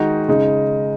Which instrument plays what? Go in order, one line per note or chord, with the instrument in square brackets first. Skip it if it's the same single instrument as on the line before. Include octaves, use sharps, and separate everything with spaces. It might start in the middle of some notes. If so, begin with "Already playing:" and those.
Already playing: [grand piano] D#3 G#3 D#4 F#4
C#3 G#3 D#4